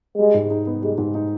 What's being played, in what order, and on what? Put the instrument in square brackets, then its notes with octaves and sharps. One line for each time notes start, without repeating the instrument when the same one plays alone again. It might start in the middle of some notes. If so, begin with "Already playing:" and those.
[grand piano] G3 [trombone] G#3
[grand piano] G#2
D#4
B3
[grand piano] G3 [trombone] G#3
[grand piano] G#2
D#4